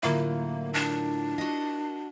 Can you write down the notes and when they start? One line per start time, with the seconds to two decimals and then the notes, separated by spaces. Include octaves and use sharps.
0.03 A2 D3 F#3 A#3 E4 F4 A#4
0.74 D4
1.38 F#4 D#5